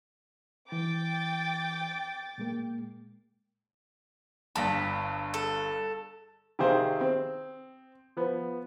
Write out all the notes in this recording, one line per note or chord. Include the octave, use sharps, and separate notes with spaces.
E3 G5 D6 A6
A#2 G#3 A#3
G1 G2 A5 B5
A4
C3 D#3 C4 G#4 C5 F5
C4
F3 B3